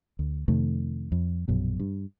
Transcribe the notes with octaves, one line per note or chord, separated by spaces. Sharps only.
D2
F2 C3 D#3 A3
F2
A#1 F#2 B2
G2